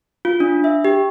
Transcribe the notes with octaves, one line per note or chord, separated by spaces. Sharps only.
F4
D4
E5
G4